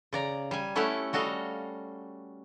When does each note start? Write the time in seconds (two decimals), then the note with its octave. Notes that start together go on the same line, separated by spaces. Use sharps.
0.13 C#3 D5 A#5
0.51 G3 G#5
0.76 A3 C#4 E4 G4 A4 F#5
1.13 G3 F#4 A4 D#5 F5